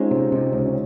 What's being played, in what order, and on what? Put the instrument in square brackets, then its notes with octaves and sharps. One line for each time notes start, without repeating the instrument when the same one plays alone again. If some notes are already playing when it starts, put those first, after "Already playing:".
Already playing: [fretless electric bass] G#3 [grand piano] C4 C#4 D#4 F4
[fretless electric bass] C3 [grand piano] C4
[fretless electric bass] C3 [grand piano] D#4
[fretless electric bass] C#2 [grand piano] C#4
[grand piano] C#4